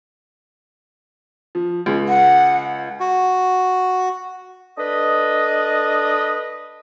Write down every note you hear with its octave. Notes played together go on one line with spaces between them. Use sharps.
F3
C#2
F#5
F#4
D4 A4 B4 D#5